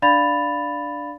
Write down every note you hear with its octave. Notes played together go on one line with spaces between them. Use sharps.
D4 D5 F5 B5 A6 F7